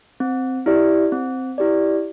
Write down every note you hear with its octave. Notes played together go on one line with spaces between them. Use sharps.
C4
E4 G4 D5
C4
E4 G4 D5